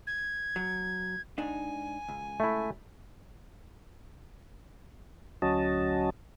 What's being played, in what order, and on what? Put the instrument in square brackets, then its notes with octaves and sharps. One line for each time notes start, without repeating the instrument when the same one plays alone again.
[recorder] G#6
[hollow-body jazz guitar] F#3
[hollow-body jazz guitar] G#2 D4 D#4 [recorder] G#5
[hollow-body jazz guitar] C#2
[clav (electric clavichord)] A3 E4
[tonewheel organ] D2 F#3 C#4 F#4 D#5 A5